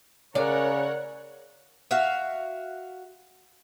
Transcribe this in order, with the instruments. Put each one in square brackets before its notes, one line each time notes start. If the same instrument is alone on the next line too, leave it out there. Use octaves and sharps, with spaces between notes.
[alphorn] C#3 [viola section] A#4 C#5 F#5 [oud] D5
[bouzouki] F#4 E5 F5